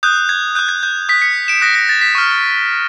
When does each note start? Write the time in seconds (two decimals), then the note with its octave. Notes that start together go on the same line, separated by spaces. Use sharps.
0.03 D#6 F#6 G6
0.29 G#6
0.55 D#6 F#6 G6
0.69 G#6
0.83 G6
1.09 D#6 B6
1.13 F#6
1.22 B6 C#7
1.48 D7 E7
1.61 D#6 F#6 A#6
1.75 A#6
1.89 A6
2.01 B6
2.15 C#6 F6